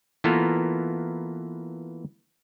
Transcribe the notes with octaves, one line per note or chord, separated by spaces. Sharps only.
E3 A#3 B3 F4 A4 A#4